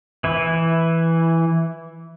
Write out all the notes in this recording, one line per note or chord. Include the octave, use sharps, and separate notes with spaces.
E3 E4